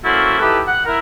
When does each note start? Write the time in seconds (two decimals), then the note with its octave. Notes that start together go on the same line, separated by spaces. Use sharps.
0.04 A#3 C#4 E4 F#4 A4 C5
0.39 D#4 E4 G4 A4 B4
0.67 F#5
0.86 E4 A#4